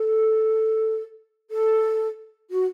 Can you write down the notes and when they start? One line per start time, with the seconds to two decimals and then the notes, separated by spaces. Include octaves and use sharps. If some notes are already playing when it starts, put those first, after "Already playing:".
Already playing: A4
1.51 A4
2.50 F#4